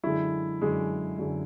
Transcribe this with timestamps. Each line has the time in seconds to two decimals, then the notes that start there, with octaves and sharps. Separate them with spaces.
0.03 F#2 D3 G#3 E4
0.62 F#2 D3 G#3
1.19 F#2 D3 G#3